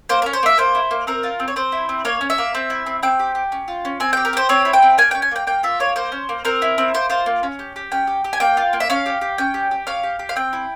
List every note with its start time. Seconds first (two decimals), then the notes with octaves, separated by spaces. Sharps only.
0.09 A#3 C5
0.22 C#4 A#4
0.33 C5
0.43 A#3 E5
0.58 A#3 C5
0.75 E4
0.91 A#3
1.07 C4 A#4
1.23 F4
1.40 C4
1.48 C#5
1.56 C4 C5
1.72 E4
1.89 C4
2.05 A#3 C#5
2.21 C#4
2.30 E5
2.38 A#3
2.55 C4
2.70 E4
2.86 C4
3.03 C4 G5
3.19 G4
3.35 G4
3.52 C#4
3.68 F4
3.85 C#4
4.00 C4 G#5
4.13 G4 G5
4.25 A#4
4.33 G4 C5
4.49 C4 C#5
4.65 E4
4.73 G5
4.82 C4
4.98 A#3 G#5
5.11 C#4 G5
5.22 G#5
5.31 A#3 G5
5.47 A#3 G5
5.63 F4 E5
5.80 A#3 C#5
5.96 A#3 C5
6.12 C#4
6.29 A#3
6.45 C4 A#4
6.62 E4
6.78 C4
6.94 A#3 C5
7.10 F4 C5
7.26 A#3
7.43 C#4
7.59 G4
7.76 G4
7.92 C#4 G5
8.07 G4
8.24 G4
8.33 G#5
8.40 A#3 G5
8.57 F4
8.73 A#3
8.80 E5
8.90 C#4 F5
9.06 G4
9.21 G4
9.38 C#4 G5
9.54 G4
9.71 G4
9.87 C#4 F5
10.03 G4
10.19 G4
10.29 F5
10.36 C4 G5
10.53 E4